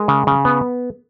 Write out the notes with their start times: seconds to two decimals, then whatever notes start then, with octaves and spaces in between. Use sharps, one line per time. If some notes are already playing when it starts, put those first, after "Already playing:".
Already playing: G#3 A#4
0.08 C#3
0.27 C#3
0.45 B3